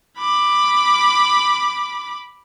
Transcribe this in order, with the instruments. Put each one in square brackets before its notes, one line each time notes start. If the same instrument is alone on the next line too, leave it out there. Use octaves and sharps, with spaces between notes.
[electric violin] B5 D6